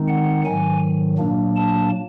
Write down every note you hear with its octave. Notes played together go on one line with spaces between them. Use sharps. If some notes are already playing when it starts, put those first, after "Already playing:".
Already playing: D#3 G#3 C4 D#4
F#5
G#2 D#3 F#3 G#5
A#2 F#3 A#3 D4
A5